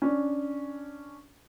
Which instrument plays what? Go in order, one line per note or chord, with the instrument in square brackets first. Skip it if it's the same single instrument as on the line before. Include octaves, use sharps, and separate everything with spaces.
[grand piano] C#4 D4